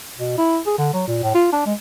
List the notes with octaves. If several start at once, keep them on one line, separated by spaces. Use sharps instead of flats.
B2
E4
G#4
D3
F#3
A#2
A2
F4
D4
G#3